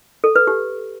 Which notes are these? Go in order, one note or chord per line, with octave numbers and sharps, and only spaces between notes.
A4
B4
G4